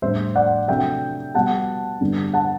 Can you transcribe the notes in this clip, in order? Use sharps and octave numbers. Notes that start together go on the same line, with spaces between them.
A2 G3 D4 C5 E5
D5 F#5
C3 F#3 A3 D4 E5 G5
B2 G3 B3 F#5 A5
G2 D3 G3 B3 D4
F#5 A5